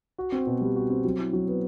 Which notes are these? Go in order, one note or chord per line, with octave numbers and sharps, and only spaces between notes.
F#4
C4
B2
G3
F#4
C4
F#3
E4
F#3
B3